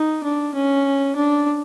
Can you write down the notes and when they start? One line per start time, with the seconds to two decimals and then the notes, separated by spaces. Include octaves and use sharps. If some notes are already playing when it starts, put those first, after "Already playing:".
Already playing: D#4
0.24 D4
0.55 C#4
1.16 D4